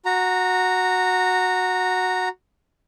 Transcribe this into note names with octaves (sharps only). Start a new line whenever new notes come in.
F#4 A#5